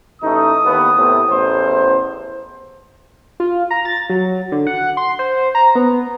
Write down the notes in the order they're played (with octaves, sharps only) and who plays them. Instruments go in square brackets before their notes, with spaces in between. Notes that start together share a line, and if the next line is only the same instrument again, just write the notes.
[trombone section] A1 A3 D#4 [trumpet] D#6
[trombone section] D#2 B3
A2 C3 B3
A1 E2 C5
[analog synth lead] F4
A#5
A6
F#3
D3
F#5
C6
C5
A#5
B3